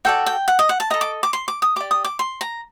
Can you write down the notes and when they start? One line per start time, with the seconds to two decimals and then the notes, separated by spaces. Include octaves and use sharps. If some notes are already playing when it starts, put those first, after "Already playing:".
0.05 F#4 A4 D5 G5
0.26 G5
0.48 F#5
0.59 D#5
0.69 F#5
0.80 A5
0.90 A4 D#5 A#5
1.01 D6
1.23 D6
1.33 C6
1.48 D6
1.62 D#6
1.76 G4 D5 D6
1.91 D#6
2.04 D6
2.19 C6
2.41 A#5